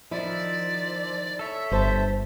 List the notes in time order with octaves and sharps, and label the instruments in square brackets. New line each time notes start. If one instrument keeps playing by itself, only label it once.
[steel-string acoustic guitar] D#3 E4 [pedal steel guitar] F3 [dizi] D5
[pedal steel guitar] A4 C#5 [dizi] E5
[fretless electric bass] G1 [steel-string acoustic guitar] G2 C5 A5